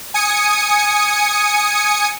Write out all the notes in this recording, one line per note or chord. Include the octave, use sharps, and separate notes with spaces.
G#5 D#6 C#7